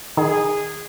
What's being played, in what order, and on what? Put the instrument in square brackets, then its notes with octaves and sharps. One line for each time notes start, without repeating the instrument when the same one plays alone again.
[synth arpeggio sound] D#3 [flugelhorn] G#4